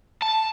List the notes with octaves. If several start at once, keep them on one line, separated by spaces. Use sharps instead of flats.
A5